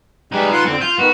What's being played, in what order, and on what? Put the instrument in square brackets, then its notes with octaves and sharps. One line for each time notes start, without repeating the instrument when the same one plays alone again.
[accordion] G3 G#3 [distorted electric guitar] D#4 B4
[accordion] F4 F#5 C6
[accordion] F2 D3 [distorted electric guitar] C4
[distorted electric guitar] F4 [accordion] G6
[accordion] D#3 B3 [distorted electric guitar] F#4